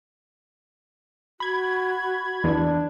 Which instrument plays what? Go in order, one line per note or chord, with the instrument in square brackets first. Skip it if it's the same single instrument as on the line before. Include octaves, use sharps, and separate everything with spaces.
[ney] F#4 [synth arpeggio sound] B5 G#6
[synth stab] E2 [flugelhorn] D4